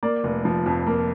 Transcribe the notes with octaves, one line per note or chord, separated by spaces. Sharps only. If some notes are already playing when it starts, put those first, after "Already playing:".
A#3 D5
F1
F3
F2
A#3